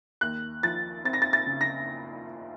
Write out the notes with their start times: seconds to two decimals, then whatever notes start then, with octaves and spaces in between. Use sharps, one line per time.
0.21 D#2 F#6
0.63 F3 A6
1.05 C4 A6
1.13 A#6
1.22 A6
1.33 A6
1.47 C#3
1.61 A#6